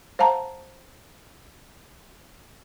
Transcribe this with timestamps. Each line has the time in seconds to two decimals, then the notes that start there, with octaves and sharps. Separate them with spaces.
0.19 C5 F5 F#5 A5 A#5